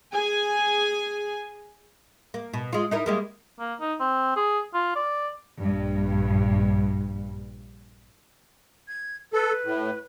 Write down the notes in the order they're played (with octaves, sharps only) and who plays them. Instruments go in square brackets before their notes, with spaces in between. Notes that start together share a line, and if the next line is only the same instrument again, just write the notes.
[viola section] G#4 G#5
[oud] A#3
B2
G#3 F4
D#4 E4 A#4
G3 G#3 A#3
[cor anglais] A#3
D#4
C4
G#4
F4
D5
[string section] A#1 G2
[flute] G#6
[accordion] A4 [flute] B4
[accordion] A2